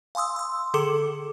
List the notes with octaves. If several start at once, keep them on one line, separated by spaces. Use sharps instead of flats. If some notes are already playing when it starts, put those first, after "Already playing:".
F5 G#5 C6 D#6 E6
C6 E6
D3 G#4 A4 D6 C#7 E7